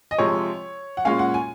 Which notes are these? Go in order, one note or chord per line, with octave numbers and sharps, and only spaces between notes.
D#5
C3 F3 G#3 C#5
F#5
A#2 G#3 C#4 F5
F#5
G#5